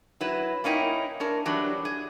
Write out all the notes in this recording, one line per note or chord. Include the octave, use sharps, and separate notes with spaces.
F#3 E4 B4
A#3 C#4 D#4 E4 G5
C#4 D4 A#4
E3 F#3 G3 D4
G#4